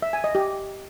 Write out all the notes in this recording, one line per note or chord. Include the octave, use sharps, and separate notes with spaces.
E5
G#5
D#5
G4